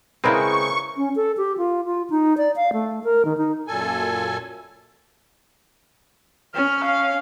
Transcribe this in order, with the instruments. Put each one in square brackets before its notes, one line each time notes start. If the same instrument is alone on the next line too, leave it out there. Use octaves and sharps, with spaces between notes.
[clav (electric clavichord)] C#3 G#3 C4 [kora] E4 A#4 B4 [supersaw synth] C#6
[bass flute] C#4
A4
G4
F4
F4
D#4
D5
F5
A3
A#4
D#3
D#4
[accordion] F#2 A#2 A4 G#5
[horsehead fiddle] C#4 [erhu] F6
[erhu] F5